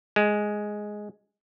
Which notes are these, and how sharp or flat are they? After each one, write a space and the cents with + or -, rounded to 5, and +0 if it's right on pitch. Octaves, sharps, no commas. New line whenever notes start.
G#3 +5